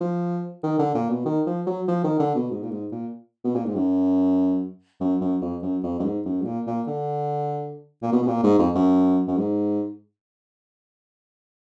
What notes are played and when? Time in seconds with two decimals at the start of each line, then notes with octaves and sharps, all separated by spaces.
0.01 F3
0.64 D#3
0.79 D3
0.95 A#2
1.10 B2
1.26 D#3
1.47 F3
1.67 F#3
1.88 F3
2.04 D#3
2.20 D3
2.36 B2
2.51 G#2
2.63 A#2
2.71 G#2
2.92 A#2
3.45 B2
3.56 A#2
3.66 G#2
3.76 F#2
5.01 F#2
5.21 F#2
5.42 F2
5.62 F#2
5.84 F2
6.00 F#2
6.04 G#2
6.26 F#2
6.42 G#2
6.45 A#2
6.67 A#2
6.88 D3
8.03 A#2
8.12 B2
8.23 B2
8.28 A#2
8.43 G#2
8.59 F2
8.75 F#2
9.28 F#2
9.38 G#2